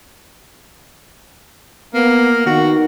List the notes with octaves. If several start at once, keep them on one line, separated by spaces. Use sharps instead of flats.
A#3 B3
D#3 F#4